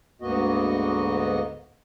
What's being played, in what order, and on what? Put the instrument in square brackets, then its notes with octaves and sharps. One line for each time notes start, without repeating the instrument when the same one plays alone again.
[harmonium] D2 G#2 A#3 B3 F#4 D#5